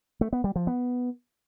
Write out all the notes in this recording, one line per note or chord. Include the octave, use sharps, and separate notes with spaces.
A3
B3
G3
F3
B3